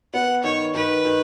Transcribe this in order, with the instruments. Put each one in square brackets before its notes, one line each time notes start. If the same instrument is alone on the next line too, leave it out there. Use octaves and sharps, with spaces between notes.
[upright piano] B3 [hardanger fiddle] F#5
[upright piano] D#3 [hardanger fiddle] C#5
[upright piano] D#3 [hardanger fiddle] B4
[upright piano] D#3